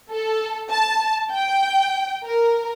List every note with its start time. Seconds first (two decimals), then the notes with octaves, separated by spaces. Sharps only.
0.11 A4
0.71 A5
1.32 G5
2.25 A#4